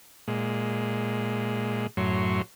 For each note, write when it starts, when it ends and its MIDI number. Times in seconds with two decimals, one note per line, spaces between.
0.28 1.87 46
0.28 1.87 56
1.97 2.42 42
1.97 2.42 45
1.97 2.42 54
1.97 2.42 73
1.97 2.42 84